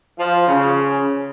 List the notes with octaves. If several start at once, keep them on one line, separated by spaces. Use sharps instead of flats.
F3
C#3